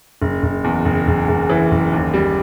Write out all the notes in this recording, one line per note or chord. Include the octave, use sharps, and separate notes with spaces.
F#1
F#1
E2
F#1
F#1
F#1
E3
F#1
D#2
G3